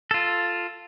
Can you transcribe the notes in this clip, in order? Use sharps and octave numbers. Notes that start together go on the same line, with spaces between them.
F4 A4